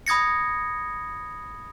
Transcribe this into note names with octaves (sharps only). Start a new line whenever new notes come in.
B5 D#6 G#6 A#6 C#7